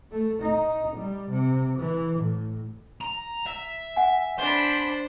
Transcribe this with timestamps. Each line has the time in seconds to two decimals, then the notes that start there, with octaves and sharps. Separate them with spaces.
0.11 A3
0.42 D#4
0.96 G3
1.30 C3
1.79 E3
2.19 A2
3.01 A#5
3.47 E5
3.96 F#5 G#5
4.39 D4 C5 B5 C6